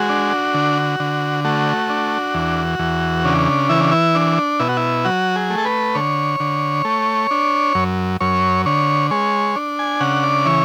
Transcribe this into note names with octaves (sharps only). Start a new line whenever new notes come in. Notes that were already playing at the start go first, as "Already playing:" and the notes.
Already playing: G#3 F#4
D4
D3
D3
A3 F#4
D4
E2
E2
C#3 D4
E3 E4
D4
E4
D4
B2 E4
F#4
E4
F#3 F#4
G#4
A3
A4
B4
D3 C#5
D3
A3
D4
F#2
F#2 C#5
D3 C#5
G#3 C#5
D4
G#5
C#3 F#5
D5
E3 C#5